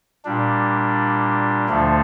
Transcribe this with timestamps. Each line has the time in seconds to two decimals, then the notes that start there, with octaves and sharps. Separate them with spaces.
0.25 A#2 G3 D4
1.69 D2 D3 F3 A3 D4